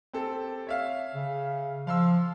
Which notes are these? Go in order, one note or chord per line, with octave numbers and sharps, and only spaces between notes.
C4 G4 A4
C#5 E5 F5
C#3
F3 F5 C6 E6